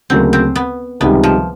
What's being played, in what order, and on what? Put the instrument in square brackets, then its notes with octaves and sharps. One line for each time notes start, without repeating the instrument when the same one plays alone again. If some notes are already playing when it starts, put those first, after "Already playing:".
[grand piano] D2 C#3 F#3 A#3 [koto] C4
[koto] C4
B3
[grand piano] C#2 C3 D#3 G3 [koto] B3
[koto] F3